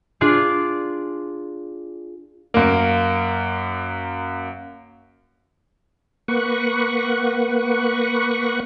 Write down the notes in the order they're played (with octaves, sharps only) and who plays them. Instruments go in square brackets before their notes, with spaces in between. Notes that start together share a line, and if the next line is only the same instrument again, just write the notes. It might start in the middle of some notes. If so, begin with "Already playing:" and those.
[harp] D4 F4 G#4 D5 C6
[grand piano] F#2 A#3
[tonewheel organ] A#3 B4 F#5 C#6